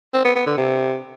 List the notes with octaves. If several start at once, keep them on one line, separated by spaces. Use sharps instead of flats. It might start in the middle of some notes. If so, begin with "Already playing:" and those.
C4
B3
B3
D3
C3